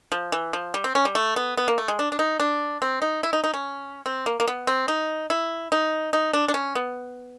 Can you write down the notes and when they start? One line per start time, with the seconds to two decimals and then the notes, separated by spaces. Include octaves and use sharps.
0.12 F3
0.32 E3
0.53 F3
0.74 G3
0.84 C4
0.95 C#4
1.05 G3
1.15 A3
1.36 B3
1.57 B3
1.68 A#3
1.78 A3
1.88 G#3
1.99 D4
2.12 D4
2.19 D#4
2.40 D4
2.82 C4
3.02 D#4
3.23 E4
3.33 D#4
3.44 D#4
3.54 C#4
4.06 C4
4.26 A#3
4.40 A#3
4.47 B3
4.67 C4
4.88 D#4
5.30 E4
5.72 D#4
6.13 D#4
6.33 D4
6.48 D4
6.54 C#4
6.75 B3